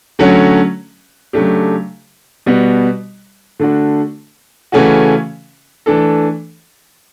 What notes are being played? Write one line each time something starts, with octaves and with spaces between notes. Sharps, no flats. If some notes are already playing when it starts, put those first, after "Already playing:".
D3 F#3 A3 C#4 F#4
C#3 F#3 A3 D4 G4
B2 G3 B3 F#4
D3 A3 D4 F#4
C#3 E3 A3 C#4 F#4
E3 A3 D4 A4